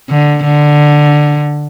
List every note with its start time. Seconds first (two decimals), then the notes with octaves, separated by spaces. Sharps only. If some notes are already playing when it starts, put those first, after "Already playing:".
0.10 D3
0.44 D3